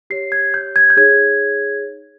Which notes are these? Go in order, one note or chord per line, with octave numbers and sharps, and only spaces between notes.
G4 C#5 C7
G#6
G6
G#6
G6
D#4 G#4 C#5 G#6